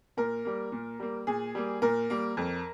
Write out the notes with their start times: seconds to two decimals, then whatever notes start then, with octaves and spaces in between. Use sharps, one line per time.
0.17 A#2 A#4
0.45 G3 A#3
0.72 A#2
1.00 G3 A#3
1.27 A#2 G#4
1.55 G3 A#3
1.82 A#2 A#4
2.10 G3 A#3
2.37 F2